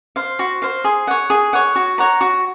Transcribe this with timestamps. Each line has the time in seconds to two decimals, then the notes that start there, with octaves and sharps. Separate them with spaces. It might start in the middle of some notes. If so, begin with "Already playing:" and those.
0.16 C5 F5
0.39 F#4
0.62 C5 F5
0.84 G#4
1.07 C#5 F#5
1.30 G#4
1.53 C#5 F#5
1.76 F#4
1.98 C#5 F#5 A#5
2.21 F#4